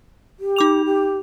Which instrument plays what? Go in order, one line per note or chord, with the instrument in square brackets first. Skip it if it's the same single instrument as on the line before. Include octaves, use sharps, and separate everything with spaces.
[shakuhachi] G4
[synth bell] D#4 D6 F7
[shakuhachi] G4